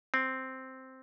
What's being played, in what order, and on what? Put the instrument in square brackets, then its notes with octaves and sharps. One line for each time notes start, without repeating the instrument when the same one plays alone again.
[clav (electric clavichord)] C4